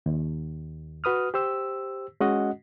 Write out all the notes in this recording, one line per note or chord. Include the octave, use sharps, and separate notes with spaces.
D#2
F#4 B4 D#6 F6
G4 C5 E6
G#3 C#4 F#4 D#5 F#5